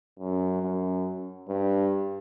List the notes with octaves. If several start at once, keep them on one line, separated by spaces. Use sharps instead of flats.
F#2
F#2
G2